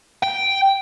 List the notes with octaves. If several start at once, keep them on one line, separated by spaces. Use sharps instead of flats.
G5